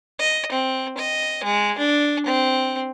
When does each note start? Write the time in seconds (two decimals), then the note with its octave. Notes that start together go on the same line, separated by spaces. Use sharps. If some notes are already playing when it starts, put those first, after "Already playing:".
0.19 D#5
0.52 C4
0.97 D#5
1.44 G#3
1.78 D4
2.26 C4